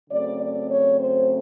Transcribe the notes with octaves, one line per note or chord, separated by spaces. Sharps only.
C#3 F#3 A3 C4 D5
D5
C#5
C5